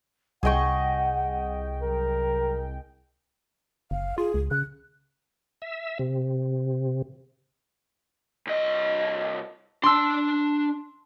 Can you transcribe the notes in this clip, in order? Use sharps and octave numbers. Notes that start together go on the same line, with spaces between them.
C2 G#4 D#5 F#5 G5 C#6
F#3 A#4
F#1 F5
F4 G#4
C#2
C#3 F#6
E5
C3
C2 D#5
D4 A5 C6 E6